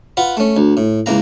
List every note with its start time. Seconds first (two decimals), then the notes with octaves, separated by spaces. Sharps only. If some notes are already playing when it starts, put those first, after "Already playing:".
0.17 F4 B4 F#5
0.37 A3 C#4
0.57 D2
0.77 A2
1.06 C#2 E3 A#3 A#5